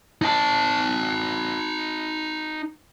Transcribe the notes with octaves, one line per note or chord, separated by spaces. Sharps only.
D#4 A5